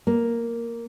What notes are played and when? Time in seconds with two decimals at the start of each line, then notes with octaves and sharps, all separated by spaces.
0.07 A#3